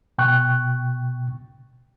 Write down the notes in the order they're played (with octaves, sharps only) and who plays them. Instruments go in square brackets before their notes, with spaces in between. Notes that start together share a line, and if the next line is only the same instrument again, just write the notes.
[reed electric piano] B2 G5 C#6 F#6